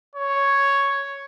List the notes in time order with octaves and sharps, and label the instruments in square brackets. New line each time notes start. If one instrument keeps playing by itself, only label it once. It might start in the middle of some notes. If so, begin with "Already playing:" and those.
[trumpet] C#5